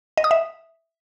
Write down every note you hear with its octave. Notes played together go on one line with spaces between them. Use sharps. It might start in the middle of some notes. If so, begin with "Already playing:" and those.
D#5
D#6
E5